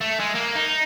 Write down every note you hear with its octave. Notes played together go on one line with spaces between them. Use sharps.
A3
G#3
A#3
D#4